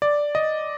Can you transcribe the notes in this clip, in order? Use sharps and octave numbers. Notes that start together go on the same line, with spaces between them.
D5
D#5